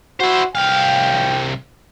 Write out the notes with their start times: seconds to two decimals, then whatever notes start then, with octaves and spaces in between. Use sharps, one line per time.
0.20 E4 F#4 C5
0.55 C2 F5 G5